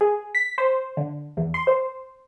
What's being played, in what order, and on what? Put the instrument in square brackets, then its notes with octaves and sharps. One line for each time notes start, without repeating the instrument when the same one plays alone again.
[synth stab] G#4
B6
C5
D3
E2
C6
C5